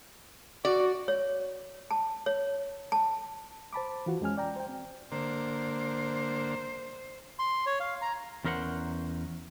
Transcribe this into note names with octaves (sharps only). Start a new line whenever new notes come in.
F#4 D5
C#5
A5
C#5
A5
C5 A5 B5 D6
E3 F4 F#4
F2 G#3 C#4 G#5 F6
D5 G5 A#5
C5 G5
C4
D3 A#3 C5
C6
C#5
F5
A#5
E2 C#4 A#4 C5 F#5